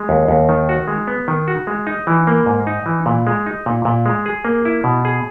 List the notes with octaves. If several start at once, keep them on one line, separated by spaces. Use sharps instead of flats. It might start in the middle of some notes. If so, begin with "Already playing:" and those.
Already playing: G#3
D#2
D#2
D#3
F#4
G#3
B3
D#3
F#4
G#3
D#4
E3
A#3
G#2
D#4
E3
A#2
G#3
D#4
A#2
A#2
G#3
G#4
A#3
E4
B2
G#4